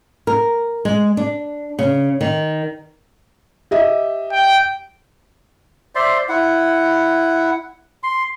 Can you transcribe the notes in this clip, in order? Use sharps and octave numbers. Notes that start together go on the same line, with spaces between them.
A#4
G#3
D4
C#3
D#3
G4 D#5 E5
G5
C5 D5 E5 C6
E4 F#5
C6